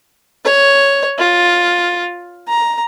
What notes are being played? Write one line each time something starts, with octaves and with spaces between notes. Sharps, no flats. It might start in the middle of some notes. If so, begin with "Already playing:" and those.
C#5
F4
A#5